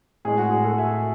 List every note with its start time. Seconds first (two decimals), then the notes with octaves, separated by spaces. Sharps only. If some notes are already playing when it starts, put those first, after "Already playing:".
0.25 A2 G#3 G#4
0.38 F#4
0.51 G#4
0.64 F#4 A4
0.78 E5 G#5